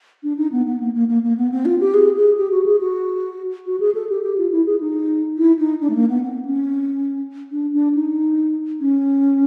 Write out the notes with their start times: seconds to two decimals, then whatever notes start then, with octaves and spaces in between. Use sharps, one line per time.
0.23 D4
0.37 D#4
0.52 B3
0.67 B3
0.80 A#3
0.94 A#3
1.09 A#3
1.24 A#3
1.38 B3
1.52 C4
1.65 F4
1.81 G4
1.94 G#4
2.17 G#4
2.38 G4
2.52 F#4
2.66 G#4
2.81 F#4
3.66 F#4
3.80 G#4
3.95 A4
4.09 G4
4.23 G4
4.38 F4
4.52 E4
4.66 G#4
4.81 D#4
5.37 E4
5.59 D#4
5.81 D4
5.90 A3
5.95 A#3
6.09 B3
6.24 C4
6.45 C#4
7.52 D4
7.73 D4
7.95 D#4
8.80 C#4